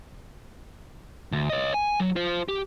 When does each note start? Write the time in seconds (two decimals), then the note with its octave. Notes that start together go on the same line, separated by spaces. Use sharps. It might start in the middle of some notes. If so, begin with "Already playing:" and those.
1.32 D2
1.50 C#5 D#5
1.74 G#5
2.00 F#3
2.16 F4 C5
2.48 G4